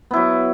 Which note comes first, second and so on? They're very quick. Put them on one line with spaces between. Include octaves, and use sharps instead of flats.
B3 E4 F#3